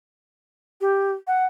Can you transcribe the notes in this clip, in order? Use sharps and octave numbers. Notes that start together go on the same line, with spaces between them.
G4
F#5